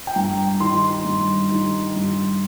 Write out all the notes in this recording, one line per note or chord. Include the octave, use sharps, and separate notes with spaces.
G5
G2 A#5
D#3 G3 C6
G2
D#3 G3
G2